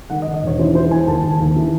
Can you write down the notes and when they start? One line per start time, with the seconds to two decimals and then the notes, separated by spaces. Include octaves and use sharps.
0.10 D#3 F#5
0.22 D#5
0.27 D#3
0.34 D#5
0.42 E1 C#5
0.59 E3 C5
0.75 E3 C5
0.91 E2 G#5
1.07 D#2 A5
1.23 D#2
1.40 D#2
1.56 E3